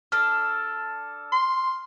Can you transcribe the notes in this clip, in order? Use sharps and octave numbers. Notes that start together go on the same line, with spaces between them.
D4 A4 F6
C6